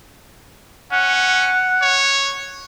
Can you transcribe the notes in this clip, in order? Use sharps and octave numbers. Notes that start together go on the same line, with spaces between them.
C#4 F#5
C#5